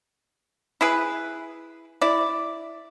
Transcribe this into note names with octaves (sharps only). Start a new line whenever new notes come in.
E4 G#4 B4
E4 D5